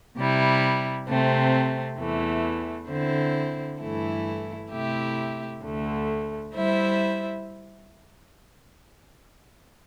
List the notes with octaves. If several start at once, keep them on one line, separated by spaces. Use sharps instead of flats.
C3 G3 E4
C3 A3 C4
E2 E3 A3
D3 C4 E4 C5
G2 E3 A3 E4 A4
C3 A3 E4 G4 E5
D2 D3 A3
G3 E4 C5 E5